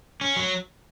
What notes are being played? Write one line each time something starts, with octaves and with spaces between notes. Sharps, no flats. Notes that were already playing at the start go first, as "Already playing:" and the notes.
C#4
F#3